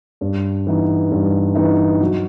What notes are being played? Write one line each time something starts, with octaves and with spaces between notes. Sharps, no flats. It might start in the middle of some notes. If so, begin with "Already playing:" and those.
G2
E3 B3 D#4
G2
E3 B3 D#4
F#3